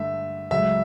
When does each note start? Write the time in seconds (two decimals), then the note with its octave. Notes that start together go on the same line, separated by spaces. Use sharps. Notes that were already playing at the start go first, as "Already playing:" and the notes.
Already playing: G2 D3 A3 E5
0.51 C#2 C#3 F#3 A3 E5